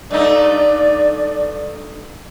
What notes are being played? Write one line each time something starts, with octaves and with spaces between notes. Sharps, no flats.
G2 A3 D#4 D5